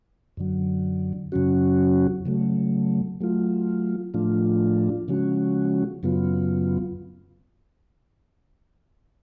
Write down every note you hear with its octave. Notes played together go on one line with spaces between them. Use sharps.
F#2 D3 F#3
F#2 C#3 F#3 C#4 F#4
C#3 F#3 A3
F#3 A3 F4
A2 F3 A3 D4 F4
C#3 F3 G#3 C#4 F#4
F#2 C#3 F#3 B3 F4